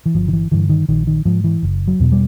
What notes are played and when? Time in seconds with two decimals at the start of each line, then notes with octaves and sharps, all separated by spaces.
0.06 E3
0.14 G1 F3
0.28 D#3
0.33 E3
0.51 G2 D3 E3
0.69 D#3
0.89 A#1 D#3
1.07 D#3
1.25 G#2 F3
1.44 E3
1.63 F#1
1.88 F#3
2.00 E2 B2
2.12 G3